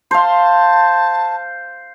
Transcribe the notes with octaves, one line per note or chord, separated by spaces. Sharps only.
C5 F5 A5